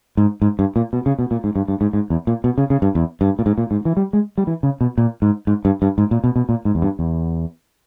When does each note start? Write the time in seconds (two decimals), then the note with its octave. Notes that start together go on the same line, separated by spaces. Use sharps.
0.17 G#2
0.42 G#2
0.59 G2
0.76 A#2
0.93 B2
1.06 C#3
1.19 B2
1.31 A#2
1.44 G#2
1.56 G2
1.68 G2
1.81 G#2
1.93 G#2
2.10 E2
2.27 A#2
2.44 B2
2.58 C#3
2.70 C#3
2.82 G2
2.95 E2
3.21 G2
3.39 A#2
3.46 G#2
3.58 A#2
3.71 G#2
3.85 E3
3.97 G3
4.13 G#3
4.38 G3
4.47 E3
4.63 C#3
4.81 B2
4.98 A#2
5.22 G#2
5.47 G#2
5.65 G2
5.82 G2
5.98 G#2
6.11 A#2
6.24 B2
6.36 B2
6.49 A#2
6.65 G#2
6.75 E2
6.82 G2
6.99 E2